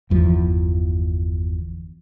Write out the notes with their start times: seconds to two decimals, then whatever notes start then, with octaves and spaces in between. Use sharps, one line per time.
0.10 G1 E2 F3